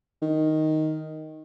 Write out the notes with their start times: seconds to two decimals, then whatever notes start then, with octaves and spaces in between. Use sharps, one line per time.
0.22 D#3